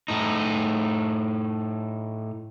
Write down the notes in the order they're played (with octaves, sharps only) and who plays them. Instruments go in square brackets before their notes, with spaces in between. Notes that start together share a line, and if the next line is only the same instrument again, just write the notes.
[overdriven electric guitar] A2 D#4